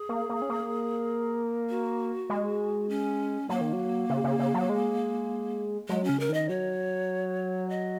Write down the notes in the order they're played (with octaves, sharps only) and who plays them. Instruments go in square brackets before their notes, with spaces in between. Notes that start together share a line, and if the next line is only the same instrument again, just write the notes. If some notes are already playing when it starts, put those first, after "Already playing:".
Already playing: [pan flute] G#4
[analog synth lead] A#3
A#3
C#4
A#3
[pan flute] F#4
[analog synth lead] G#3
[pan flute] C#4
[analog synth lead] F#3 [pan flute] A#3
[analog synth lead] D#3
F#3
C#3
C#3
C#3
F#3
G#3
[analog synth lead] F#3 [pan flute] G#3
[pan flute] C#4
[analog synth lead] C#3
[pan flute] A#4
[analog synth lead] D#3 [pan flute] D#5
[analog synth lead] F#3 [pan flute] C#5
[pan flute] D#5